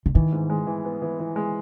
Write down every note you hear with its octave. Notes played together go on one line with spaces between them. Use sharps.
D3
D#3 E3
G#2
G#3
E3
B3
E3
E3
G#3